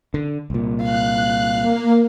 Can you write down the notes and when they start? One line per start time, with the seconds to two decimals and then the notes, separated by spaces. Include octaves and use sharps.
0.14 D3
0.50 C2 A#2
0.83 F5 F#6
1.62 A#3